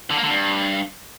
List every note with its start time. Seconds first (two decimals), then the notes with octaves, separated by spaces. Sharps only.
0.11 D3
0.17 A#3
0.24 D3
0.30 G2